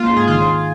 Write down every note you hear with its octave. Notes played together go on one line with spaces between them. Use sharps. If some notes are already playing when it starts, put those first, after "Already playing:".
Already playing: A#3 F4
G#2
G#4
D#3 F4